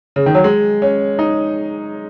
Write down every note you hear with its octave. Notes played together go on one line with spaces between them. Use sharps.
C#3
D#3
F#3
G#3
C#4
D#4